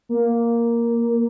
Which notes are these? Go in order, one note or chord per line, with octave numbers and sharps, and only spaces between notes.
A#3